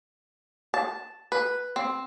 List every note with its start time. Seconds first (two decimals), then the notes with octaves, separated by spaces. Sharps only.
0.74 A5
1.32 B4
1.76 C4